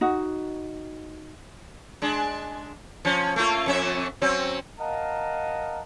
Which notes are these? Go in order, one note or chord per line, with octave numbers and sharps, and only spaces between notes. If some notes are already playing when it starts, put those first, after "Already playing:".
D#4 F#4
G#3 D4
F3 C#4
A3 A#3 F4
F2 C#4 E5
F#3 C4 C#4
A#4 D#5 F5 F#5 A5 A#5